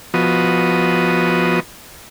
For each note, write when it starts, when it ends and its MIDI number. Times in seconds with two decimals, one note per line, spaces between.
0.14 1.60 53
0.14 1.60 59
0.14 1.60 66
0.14 1.60 75